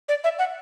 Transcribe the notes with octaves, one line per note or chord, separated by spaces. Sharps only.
D5
E5
F#5